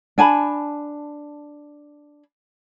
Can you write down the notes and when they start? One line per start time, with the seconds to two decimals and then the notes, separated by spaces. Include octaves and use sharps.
0.18 D4 G#5 A5 B5